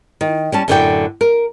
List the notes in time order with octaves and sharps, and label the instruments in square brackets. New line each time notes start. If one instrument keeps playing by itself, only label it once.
[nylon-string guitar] D#3
G3 C#4 A5
F#2 A2 D3 F#4 D5 G5
A#4